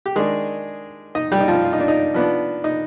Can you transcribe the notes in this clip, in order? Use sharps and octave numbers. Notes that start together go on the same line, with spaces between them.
G4
D#3 G#3 D4 G#4
D#4 D#5
G3 G4
D#4
F3 F4
F4
D#4
D4
D#4
F3 B3 D4
D#4